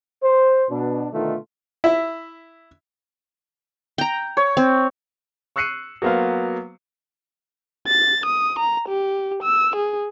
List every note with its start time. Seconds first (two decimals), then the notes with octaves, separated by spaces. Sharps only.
0.22 C5
0.70 B2 D4
1.13 B2 D3 D#3 A3 D#4 F4
1.84 E4 E5
3.98 G5 A#5
4.37 C#5
4.57 C4
5.56 C#6 E6 F#6 C7 C#7 D#7
6.02 F#3 A#3 B3 C5 F5
7.88 A6
8.26 D#6
8.59 A#5
8.89 G4
9.43 E6
9.76 G#4